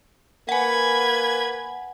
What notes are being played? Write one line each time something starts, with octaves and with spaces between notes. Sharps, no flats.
A#3 B4 F#5 G#5 G#6